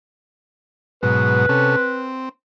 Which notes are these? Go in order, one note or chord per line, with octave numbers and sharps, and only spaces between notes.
G#2 B2 F#3 B4
C3 C#4 A4
C4